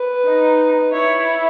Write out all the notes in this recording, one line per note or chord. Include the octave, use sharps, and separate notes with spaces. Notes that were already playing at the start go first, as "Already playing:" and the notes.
Already playing: B4
D#4
E4 C#5